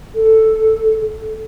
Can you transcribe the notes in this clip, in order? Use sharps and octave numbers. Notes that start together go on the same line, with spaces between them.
A4